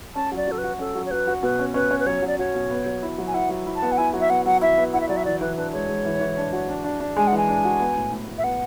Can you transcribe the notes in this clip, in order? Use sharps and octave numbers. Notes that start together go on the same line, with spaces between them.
C#4 A5
F#3 D5
F#3 A4
B4
F#4
C#4 A4
F#3
C#5
F#3 B4
F#4
B2 B4
C#4
C#4 B4
C#4
B4
F#3 C#5
F#3 D5
F#4 C#5
B2
B3
F#3
E4
F#3
G#5
E4 F#5
F#3
E4
A5
B3
F#5
E4 G#5
F#3
E5
B3 F#5
F#3 F#5
E4 E5
B3
E4 F#5
E5
F#3 D5
E5
E3 D5
E3 B4
D4 B4
G#3 C#5
G#3
E3
E3
D4
F#4
D4
D4
D4
G#3 G#5
F#5
E3
G#5
D4
F#4
B3
A2
A2
A2
E5
B3 F#5